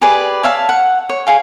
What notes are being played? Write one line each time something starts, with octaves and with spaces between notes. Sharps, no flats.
G4 G#4 B4 D5
C#5 E5 F5 A5
F#5
C#5
G#4 F5 G5